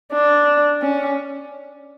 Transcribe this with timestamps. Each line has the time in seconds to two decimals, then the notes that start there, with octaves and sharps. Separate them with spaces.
0.13 D4
0.82 C#4